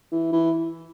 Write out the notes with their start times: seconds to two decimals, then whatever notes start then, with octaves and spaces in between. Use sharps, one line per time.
0.12 E3
0.32 E3